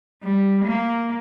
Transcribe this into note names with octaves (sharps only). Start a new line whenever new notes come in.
G3
A#3